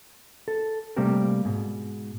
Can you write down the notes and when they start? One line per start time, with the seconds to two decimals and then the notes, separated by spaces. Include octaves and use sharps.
0.48 A4
0.96 C3 G3 A3 A#3 C4 A#4
1.45 G#2 B2